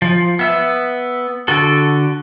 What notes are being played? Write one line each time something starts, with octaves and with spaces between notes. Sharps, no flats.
F3
B3 E5
D3 F#4 A4